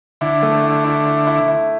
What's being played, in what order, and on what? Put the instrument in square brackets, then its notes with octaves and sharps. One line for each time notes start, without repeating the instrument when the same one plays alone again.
[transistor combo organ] D3 [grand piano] E4
[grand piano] A3
E4
E4
E4
E4
E4